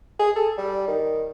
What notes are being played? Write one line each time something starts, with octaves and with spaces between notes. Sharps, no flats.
G#4
A4
G3
D#3